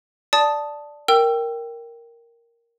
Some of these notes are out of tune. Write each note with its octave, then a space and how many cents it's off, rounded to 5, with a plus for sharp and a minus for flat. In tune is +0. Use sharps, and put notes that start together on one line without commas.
D5 +0 A5 +0 D#6 +0
A#4 +0 G5 +0 E6 +25